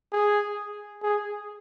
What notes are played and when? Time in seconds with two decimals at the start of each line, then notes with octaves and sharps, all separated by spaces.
0.12 G#4
1.03 G#4